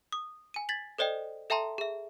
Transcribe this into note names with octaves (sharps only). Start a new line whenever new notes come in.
D#6
G#5 D#7
G#6 A6 B6 F#7
A4 C5 D5 D#5 G5
A4 E5 G5 A5 A#5 C6
G#4 E5